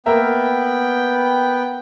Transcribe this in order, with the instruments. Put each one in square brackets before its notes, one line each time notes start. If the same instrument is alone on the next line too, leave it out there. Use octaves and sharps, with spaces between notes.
[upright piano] A#3 A#4 E5 [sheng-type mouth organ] B3 G5